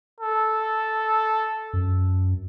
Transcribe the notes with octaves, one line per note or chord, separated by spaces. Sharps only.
A4
F#2